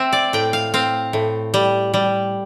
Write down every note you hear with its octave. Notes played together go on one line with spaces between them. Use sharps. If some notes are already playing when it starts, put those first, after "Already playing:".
Already playing: C4 E5
D5
A2 G5
F5
C4 F5
A2
G3
G3